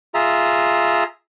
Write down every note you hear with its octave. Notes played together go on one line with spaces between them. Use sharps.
F4 G#4 E5 A#5